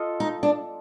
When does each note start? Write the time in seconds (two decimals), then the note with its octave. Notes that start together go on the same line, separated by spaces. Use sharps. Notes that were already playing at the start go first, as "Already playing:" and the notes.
Already playing: F4 A4 D#5
0.20 D#4
0.43 D4